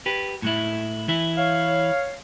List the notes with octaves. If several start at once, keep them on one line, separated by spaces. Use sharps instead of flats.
G4 B4
A2 G#3 E4
E3 E4
C#5 F5